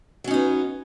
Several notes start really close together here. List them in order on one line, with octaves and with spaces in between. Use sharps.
F#3 C#4 D#4 B3